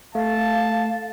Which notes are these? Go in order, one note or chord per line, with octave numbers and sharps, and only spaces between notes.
A3 F5 A5